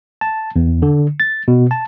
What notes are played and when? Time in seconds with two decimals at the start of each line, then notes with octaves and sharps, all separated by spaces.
0.21 A5
0.56 E2
0.82 D3
1.20 A6
1.48 B2
1.71 A5